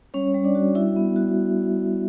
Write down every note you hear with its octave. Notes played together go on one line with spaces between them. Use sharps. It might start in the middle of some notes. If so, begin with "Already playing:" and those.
G3 C#4 C#5
G3
D4 D5
F#4
E4 F#4 E5
B3
F#4